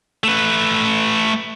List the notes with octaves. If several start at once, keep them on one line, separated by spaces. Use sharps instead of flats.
A3 B4